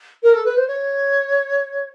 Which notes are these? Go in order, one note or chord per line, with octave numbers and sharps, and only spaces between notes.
A#4
A4
B4
C5
C#5